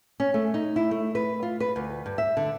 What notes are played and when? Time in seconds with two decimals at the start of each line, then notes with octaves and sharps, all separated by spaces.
0.20 C#4
0.34 A3
0.54 D#4
0.76 E4
0.91 A3
1.15 B4
1.43 F4
1.60 B4
1.76 D2
2.06 G2
2.18 E5
2.37 D3